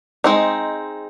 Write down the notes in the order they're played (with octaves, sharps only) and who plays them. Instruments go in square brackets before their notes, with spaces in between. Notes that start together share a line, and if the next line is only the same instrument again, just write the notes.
[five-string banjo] G#3 C4 D#4